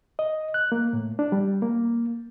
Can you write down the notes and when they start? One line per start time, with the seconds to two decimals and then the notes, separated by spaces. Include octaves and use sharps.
0.19 D#5
0.54 F#6
0.72 A#3
0.93 A2
1.19 D4
1.32 G3
1.62 A#3